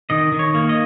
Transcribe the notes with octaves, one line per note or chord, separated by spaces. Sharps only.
D#3 D#5
D#3
C#5
A#3
D#5